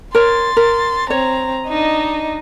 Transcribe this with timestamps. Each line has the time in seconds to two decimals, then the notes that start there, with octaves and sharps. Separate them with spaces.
0.15 A#4 C#5 C6 A6
0.57 A#4
1.10 C4 C#5 A#5
1.69 D4 D#4 D#5